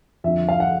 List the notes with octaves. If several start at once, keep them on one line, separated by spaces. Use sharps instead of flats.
F2 D3 F3 E5
F5
F#5